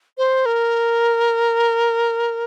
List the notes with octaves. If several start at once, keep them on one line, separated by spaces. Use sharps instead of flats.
C5
A#4